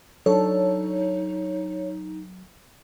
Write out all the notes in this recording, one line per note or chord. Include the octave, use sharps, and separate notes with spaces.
F#3 D4 D#4 A4 C#5